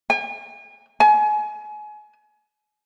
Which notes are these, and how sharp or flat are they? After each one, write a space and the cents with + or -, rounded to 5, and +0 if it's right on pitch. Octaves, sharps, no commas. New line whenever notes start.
G#5 -40
G#5 +30